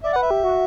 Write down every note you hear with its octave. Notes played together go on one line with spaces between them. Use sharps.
D5 E5
B4 F#5
E5
G4
F#4